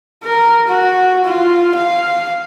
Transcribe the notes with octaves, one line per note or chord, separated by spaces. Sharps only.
A#4
F#4
F4
F5